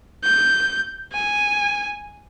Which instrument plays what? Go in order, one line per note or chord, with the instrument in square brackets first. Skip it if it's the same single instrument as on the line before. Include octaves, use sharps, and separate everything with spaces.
[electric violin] G6
G#5